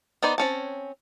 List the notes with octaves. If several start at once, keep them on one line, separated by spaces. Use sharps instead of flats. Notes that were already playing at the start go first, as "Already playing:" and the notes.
B3 D#4 C5 D5
C4 C#4 A5